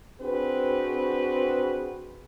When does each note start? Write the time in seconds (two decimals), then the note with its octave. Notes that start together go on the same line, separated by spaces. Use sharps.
0.21 C4 D4 F#4 G#4 B4